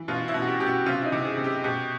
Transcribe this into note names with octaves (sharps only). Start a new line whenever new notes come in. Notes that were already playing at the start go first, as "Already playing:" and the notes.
Already playing: E3
B2 F4
E4
B2
F#4
G4
B2 G4
F#4
C3 F4
E4
D#4
C3
G#4
C3
G4
B2 G4